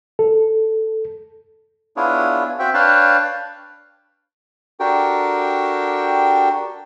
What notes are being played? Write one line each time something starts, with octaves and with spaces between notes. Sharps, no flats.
A4
B3 D4 E4 F4 G#4 C#5
C4 F#4 E5 G5
D4 B4 C#5 F5 G5 A5
D4 F#4 G4 A4 A#4 G5